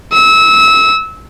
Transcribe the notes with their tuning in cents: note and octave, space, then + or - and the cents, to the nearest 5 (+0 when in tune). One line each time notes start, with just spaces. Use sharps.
E6 -25